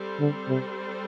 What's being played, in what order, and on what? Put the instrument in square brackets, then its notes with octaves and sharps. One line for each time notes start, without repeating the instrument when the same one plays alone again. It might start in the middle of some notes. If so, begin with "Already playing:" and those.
Already playing: [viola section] G3 C4 A4 C5
[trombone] D3
C3